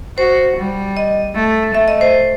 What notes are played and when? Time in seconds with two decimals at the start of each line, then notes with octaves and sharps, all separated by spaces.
0.18 F#4 C5
0.57 G3
0.97 D#5
1.35 A3
1.74 A3 E5
1.88 D#5
2.01 C5